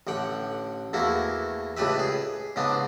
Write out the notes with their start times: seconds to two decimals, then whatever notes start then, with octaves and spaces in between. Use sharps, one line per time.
0.07 A1 D3 F#5 G5
0.93 E2 A3 A#3 E4 F#4
1.77 C#2 A2 D4 G4 B4 E5
1.99 G#4
2.56 G#2 C#3 B3 C4 D4